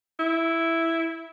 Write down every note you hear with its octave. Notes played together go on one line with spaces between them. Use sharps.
E4